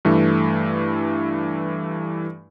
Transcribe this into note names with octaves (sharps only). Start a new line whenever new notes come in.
G2 E3 A3